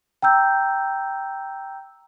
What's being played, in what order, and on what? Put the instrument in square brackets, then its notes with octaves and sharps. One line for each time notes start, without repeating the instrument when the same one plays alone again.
[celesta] G5 A#5 E6 G6